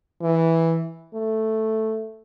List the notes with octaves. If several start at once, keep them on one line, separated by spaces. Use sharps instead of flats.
E3
A3